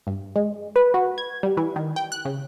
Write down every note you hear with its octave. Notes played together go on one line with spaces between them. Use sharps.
G2
G#3
B4
F#4
G#6
G3
E3
D#3
G5
F#6
C#3